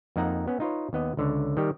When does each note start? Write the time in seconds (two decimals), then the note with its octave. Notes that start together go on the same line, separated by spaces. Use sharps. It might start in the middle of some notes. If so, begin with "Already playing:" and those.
0.16 F2 A#3 D#4 F#5 A#5
0.48 B3 C#4
0.60 D#4 F4 B4 C#5
0.93 D#2 B3 D#5
1.17 C#2 D3 C#5
1.57 D#3 G3 G4